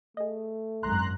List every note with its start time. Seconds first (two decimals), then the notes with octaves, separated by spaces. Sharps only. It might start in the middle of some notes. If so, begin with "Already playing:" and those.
0.17 A3 G#4 D#5
0.83 G#1 F#2 A#5 C6 F#6